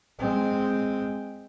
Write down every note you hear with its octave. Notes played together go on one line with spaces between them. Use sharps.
G#3 C4